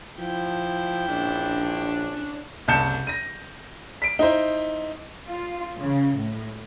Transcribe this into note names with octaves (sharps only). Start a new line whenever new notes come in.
F3 E4 G5
A#1 C#4 D4
F#1 C2 A5 G6 C#7 E7
A#6 D#7
B6 D7
D#4 E4 C5
F4
C#3
A2